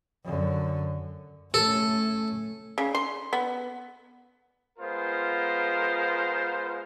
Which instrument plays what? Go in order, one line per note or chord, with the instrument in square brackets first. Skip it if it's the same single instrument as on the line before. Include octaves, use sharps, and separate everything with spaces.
[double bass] F#2 D3
[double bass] A3 C#4 [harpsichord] A4
[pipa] C#3
C6
B3
[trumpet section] G#3 B3 F4 A#4 C5